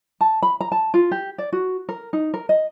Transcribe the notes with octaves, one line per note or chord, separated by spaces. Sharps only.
A5
B5
A#5
A5
F4
G4
D5
F#4
A#4
D#4
A#4
D#5